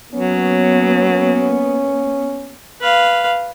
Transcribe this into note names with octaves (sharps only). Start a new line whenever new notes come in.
F#3 A#3 B3 C#4
B4 F5